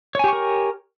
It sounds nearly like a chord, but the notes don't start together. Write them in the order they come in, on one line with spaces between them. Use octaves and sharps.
C#5 G#5 G4 C#6 A#4